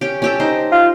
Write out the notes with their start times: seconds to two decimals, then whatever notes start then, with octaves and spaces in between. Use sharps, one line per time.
0.01 C#4 G4
0.22 C#4 G4 A4
0.40 D#4 C5
0.72 F4